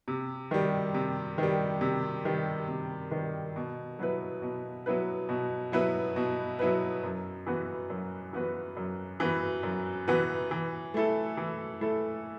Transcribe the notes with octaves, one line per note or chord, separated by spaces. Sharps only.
C3
D#3 G3
C3
D#3 G3
C3
D#3 G3
C3
D#3 G3
B2
F#3 B3 E4 B4
B2
F#3 B3 E4 B4
B2
F#3 B3 E4 B4
B2
F#3 B3 E4 B4
F#2
E3 B3 F#4 B4
F#2
E3 B3 F#4 B4
F#2
E3 B3 F#4 B4
F#2
E3 B3 F#4 B4
E3
A3 E4 A4
E3
A3 E4 A4